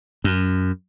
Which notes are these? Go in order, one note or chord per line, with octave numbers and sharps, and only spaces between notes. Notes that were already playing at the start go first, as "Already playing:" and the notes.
F#2